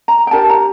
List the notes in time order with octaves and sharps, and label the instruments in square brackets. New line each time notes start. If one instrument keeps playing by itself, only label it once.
[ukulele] A#5
G5
D4 G4 A#4 A5
A#5